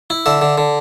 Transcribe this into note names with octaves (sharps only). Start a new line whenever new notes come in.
E4
D3 E5
D3
D3